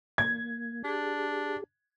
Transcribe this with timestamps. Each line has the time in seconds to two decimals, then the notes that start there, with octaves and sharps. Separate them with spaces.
0.18 A#3 G#6
0.84 D4 G4 G#4